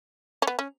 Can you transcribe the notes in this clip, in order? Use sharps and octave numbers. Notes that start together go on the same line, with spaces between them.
C#4
B3
C#4